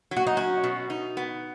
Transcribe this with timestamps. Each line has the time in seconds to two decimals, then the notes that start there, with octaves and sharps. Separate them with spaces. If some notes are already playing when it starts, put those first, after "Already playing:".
0.11 F#3
0.17 F#4
0.27 D#4
0.37 C#4 F#4
0.64 B2
0.90 D#4
1.17 B3